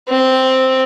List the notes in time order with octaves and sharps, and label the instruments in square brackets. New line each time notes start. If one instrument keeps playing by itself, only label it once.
[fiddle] C4